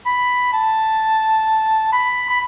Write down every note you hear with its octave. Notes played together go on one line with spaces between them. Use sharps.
B5
A5
B5
B5